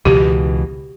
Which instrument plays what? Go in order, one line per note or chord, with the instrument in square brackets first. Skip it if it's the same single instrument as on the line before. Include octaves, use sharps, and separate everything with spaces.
[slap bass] C#2 B2 E3 [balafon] G4